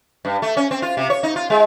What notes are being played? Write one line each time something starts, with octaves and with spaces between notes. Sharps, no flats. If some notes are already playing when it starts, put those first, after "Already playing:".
G2
A3
C#4
C4
F4
C3
C#5
D#4
F4
G#3